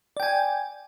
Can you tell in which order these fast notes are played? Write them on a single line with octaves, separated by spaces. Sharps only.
D5 G5 G#5